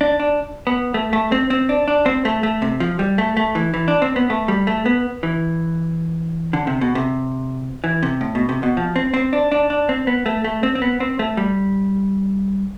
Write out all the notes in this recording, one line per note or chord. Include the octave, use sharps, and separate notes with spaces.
D4
D4
B3
A3
A3
C4
C4
D4
D4
C4
A3
A3
C3
F3
G3
A3
A3
E3
E3
D4
C4
B3
A3
G3
A3
B3
E3
D3
C3
B2
C3
E3
C3
A2
B2
C3
B2
F3
C4
C4
D4
D4
D4
C4
B3
A3
A3
C4
C4
B3
C4
A3
G3